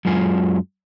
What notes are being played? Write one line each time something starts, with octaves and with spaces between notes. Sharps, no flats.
F#2 F#3 G#3 F4 G#5